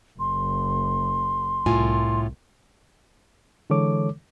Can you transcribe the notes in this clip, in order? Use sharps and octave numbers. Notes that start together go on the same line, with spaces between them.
F#1 C6
C2 A2 F4 G#5
D3 E3 G#3 A4 C#5 D6